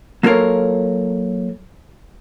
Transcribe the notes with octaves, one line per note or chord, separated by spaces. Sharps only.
F#3 A#3 F4 A4 A#4 C#5